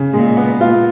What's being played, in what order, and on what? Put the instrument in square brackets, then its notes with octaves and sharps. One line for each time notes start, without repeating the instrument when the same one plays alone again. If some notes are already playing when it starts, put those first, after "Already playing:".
Already playing: [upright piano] C#3
[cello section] A#2 [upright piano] G#3
[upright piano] B3
[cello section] A#2 [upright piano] F4